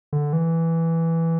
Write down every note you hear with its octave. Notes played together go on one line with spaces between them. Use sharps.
D3
E3